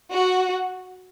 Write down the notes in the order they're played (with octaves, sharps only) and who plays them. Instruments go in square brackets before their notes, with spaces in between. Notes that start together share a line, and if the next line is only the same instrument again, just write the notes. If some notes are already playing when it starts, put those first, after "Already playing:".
[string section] F#4